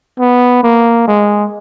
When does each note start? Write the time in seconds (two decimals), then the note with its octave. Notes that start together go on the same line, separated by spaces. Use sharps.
0.19 B3
0.63 A#3
1.08 G#3